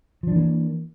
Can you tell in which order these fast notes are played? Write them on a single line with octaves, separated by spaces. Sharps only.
F3 D4 E3 A#3